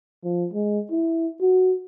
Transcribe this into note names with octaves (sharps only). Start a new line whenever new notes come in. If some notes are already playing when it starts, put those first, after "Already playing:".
F3
G#3
E4
F#4